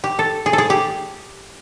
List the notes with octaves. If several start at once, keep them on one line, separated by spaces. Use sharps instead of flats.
G4
A4
G#4
A4
G#4
G4